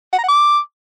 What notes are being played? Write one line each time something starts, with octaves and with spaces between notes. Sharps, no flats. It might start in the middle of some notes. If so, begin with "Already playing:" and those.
F#5
A#5
F#5
D6